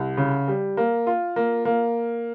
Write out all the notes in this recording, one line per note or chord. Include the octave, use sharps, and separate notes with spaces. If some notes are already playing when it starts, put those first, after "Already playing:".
Already playing: C2
C#3
G3
A#3
F4
A#3
A#3